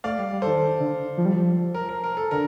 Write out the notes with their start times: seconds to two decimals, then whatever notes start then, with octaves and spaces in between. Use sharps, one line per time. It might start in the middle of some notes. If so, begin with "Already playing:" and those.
0.04 A3 D5 F5
0.18 G3
0.32 G3
0.42 D#3 A4 C5
0.80 D3
1.17 F3
1.25 G3
1.33 F3
1.74 A#4
1.89 A#4
2.04 A#4
2.17 A4
2.31 D3 A#4